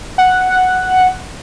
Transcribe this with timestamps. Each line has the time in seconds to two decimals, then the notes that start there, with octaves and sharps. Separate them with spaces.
0.18 F#5